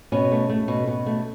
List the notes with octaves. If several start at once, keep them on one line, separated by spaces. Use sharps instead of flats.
B2 C#4
A3
A3
B2
B2
A3